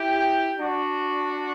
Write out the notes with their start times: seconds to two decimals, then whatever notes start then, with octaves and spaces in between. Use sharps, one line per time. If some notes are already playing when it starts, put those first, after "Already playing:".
Already playing: E4 G4
0.59 D4 F#4